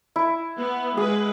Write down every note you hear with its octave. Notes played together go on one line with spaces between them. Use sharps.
E4
B3
G#3 G#4 B4